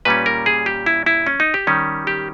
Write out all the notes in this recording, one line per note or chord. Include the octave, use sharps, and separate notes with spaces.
A#2 G3 C#4 B4
A#4
G#4
G4
E4
E4
C#4
D#4
G4
D#3 G3 C#4
G4